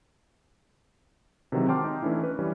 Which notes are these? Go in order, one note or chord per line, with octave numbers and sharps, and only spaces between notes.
C3 D#3 E3 F#3 G#3 C4
G5 A5 C6 D6 F6
D#4
E3 A3 C#4 D4 E4
B4
E3 G3 C#4